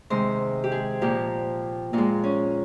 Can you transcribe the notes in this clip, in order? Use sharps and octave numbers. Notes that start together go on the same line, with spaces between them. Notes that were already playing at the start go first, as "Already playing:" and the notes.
C3 D#3 G#3 C5
G4
G#4
A#2 F3 A#3 G4
A#2 G#3 F4
C#4